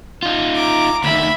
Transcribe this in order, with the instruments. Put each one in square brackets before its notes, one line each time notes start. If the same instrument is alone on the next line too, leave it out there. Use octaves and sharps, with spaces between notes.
[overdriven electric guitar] D#4 F4
[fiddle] A#5 D6
[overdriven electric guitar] D2 D#3 [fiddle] E5 B5